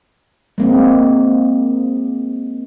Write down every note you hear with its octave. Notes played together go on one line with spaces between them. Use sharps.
G#3 A#3 C4